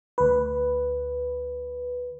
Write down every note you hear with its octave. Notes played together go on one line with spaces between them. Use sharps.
D2 B4